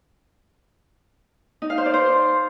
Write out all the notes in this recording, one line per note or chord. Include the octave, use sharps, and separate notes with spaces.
D#4
F5
C5
D5
C5